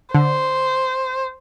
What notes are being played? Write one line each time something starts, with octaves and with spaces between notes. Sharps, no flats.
D3 C5